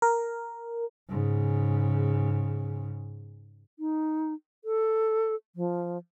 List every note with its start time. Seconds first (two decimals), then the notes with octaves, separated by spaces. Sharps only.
0.02 A#4
1.09 G#2 C#3
3.79 D#4
4.65 A4
5.56 F3